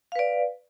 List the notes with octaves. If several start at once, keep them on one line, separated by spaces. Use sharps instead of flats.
B4 D5 F5